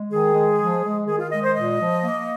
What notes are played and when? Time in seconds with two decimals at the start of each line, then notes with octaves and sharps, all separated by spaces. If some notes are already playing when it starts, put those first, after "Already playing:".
Already playing: G#3
0.11 D#3 G#4
0.35 G#3
0.60 F3
0.83 G#3
1.07 D#3 G#4
1.19 F4
1.31 G#3 D#5
1.43 C5
1.55 A#2 D#5
1.80 F3
2.03 A#3